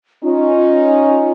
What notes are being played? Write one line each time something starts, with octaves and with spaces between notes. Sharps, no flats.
C#4 D#4 F4